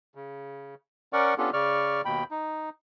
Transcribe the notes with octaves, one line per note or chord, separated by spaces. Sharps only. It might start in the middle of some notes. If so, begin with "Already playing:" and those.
C#3
C#4 A#4 D5 F#5 C#6
B3 C#4 D4 F4 G4 A4
C#3 D5 C#6 F6
D#2 B2 G5 B5
D#4